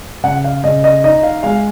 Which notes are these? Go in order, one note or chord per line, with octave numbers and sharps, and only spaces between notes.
C#3 F#5
F5
C#3 D#5
D#5
D#4 D#5
F5
G#3 F5